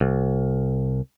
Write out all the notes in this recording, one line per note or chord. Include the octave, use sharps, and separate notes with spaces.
C2